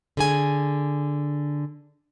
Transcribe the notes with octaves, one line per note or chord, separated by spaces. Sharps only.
D3 G#4 G#5